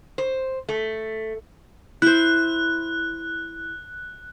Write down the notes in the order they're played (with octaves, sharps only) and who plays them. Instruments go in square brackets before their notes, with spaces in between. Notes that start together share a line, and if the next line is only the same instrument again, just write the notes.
[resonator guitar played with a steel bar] C5
A3
[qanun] E4 C5 [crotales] F#6